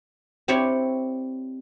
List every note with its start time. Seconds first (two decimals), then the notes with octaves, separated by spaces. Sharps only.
0.48 C4 E4 G4 C#5 D5